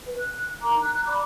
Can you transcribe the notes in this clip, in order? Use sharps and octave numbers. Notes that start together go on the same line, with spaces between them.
B4
F#6
D#4 A#4 A#5 D6
A#5 F#6
D5 B5 D6